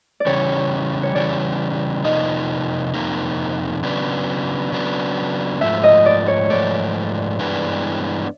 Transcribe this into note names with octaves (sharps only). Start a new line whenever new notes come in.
D5
C#3 E3 G3 C#5
C#5
C#3 E3 G3 D5
F2 C3 F3 A#3 D#4 D#5
F2 C3 F3 A#3 D#4
C#3 F#3 B3 D4
C#3 F#3 B3 D4
G#2 F3 A3 E5
D#5
D5
C#5
G#2 F3 A3 D5
G2 E3 G#3 B3 D4